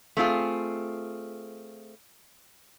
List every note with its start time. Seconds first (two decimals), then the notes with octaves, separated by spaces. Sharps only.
0.17 A3 C4 F4 G#4